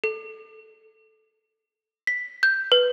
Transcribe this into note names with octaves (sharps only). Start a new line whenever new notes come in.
A4
B6
G6
B4